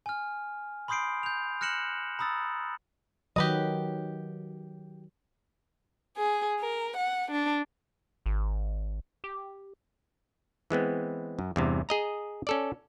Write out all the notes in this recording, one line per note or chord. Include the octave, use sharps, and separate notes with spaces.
G#5 F6
B5 C6 D#6 G6 C7 D7
G6 F7
F6 F#6 A#6 C#7 E7 F#7
A#5 B5 D#6 E6 A6
D#3 F#3 G4 B4 D#5
G#4
A#4
F#5
D4
G#1
G4
E3 G#3 B3 C4
F#2
E2 G2 C3
G#4 D#5 A#5
C#4 A4 D5